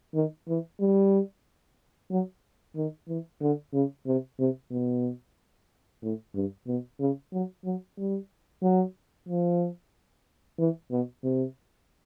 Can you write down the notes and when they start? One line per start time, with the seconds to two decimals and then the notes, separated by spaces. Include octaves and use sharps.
0.15 D#3
0.48 E3
0.80 G3
2.11 F#3
2.76 D#3
3.08 E3
3.41 D3
3.73 C#3
4.06 C3
4.39 C3
4.71 B2
6.02 A2
6.35 G2
6.67 B2
7.00 C#3
7.33 F#3
7.65 F#3
7.98 G3
8.63 F#3
9.29 F3
10.59 E3
10.91 B2
11.24 C3